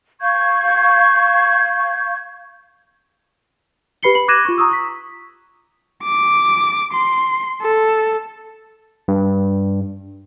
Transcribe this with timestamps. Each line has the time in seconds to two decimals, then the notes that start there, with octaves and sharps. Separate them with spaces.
0.21 F5 C#6 G6 G#6
4.03 G4 B4 B5 C7 C#7 G7
4.15 B5 F#7
4.28 D6 F#6 G#6 A#6 D#7 E7
4.45 F4 C#6
4.58 A#5 C#6 D#6 E6
4.71 C#6 B6
6.04 D6
6.93 C6
7.62 A4
9.08 G2